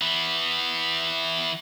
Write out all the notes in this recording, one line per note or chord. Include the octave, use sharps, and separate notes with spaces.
E3 B3